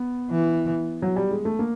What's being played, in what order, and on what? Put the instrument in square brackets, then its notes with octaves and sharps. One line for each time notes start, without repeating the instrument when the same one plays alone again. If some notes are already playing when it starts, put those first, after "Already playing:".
Already playing: [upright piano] B3
[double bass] E3
[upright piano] F#3
G3
G#3
A3
A#3